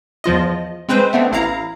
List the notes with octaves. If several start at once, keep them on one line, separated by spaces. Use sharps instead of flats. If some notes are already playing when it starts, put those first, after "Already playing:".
E2 F3 F4 D#5
G#3 C4 B4 C5
A3 B3 C4 D4
A1 E4 F5 A#5